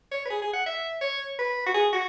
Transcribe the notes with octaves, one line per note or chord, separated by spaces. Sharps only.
C#5
B4
G#4
G#4
F#5
E5
C#5
B4
F#4
G#4
F#4